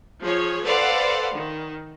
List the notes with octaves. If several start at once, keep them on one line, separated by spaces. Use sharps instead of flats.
F3 G#4 C#5
A4 B4 C5 D5 F5 F#5
D#3